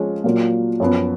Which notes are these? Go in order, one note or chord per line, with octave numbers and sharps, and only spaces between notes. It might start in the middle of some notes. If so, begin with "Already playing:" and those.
Already playing: F3 G#3 C#4
A#2 F#3 A#3 F4
F#2 F3 B3